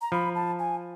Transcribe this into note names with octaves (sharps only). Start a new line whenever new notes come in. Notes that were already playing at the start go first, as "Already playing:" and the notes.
A#5
F3 B5
A5
G#5